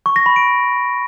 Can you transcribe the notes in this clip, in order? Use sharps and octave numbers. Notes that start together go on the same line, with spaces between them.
C#6
A#6
B5
D7